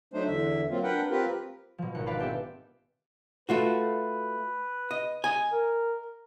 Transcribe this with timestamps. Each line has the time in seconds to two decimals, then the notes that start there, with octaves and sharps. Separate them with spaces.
0.14 F#3 A3 D4 D#4 C5
0.26 E2 D3 E5
0.69 F#3 A#3 C4 F4
0.83 D4 A#4 B4 F#5 G5
1.10 C4 F4 G4 A#4 B4
1.78 B2 F3
1.95 G#1 F#5
2.06 D4 F4 B4 D5 F5 B5
2.19 B3 C4 G4 A4 C5 E5
3.49 A3 F4 F#4 B4
4.91 D#5
5.24 D#5 G#5
5.52 A#4